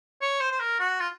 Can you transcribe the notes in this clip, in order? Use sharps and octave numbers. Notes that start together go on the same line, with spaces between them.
C#5
C5
C5
A#4
F#4
F4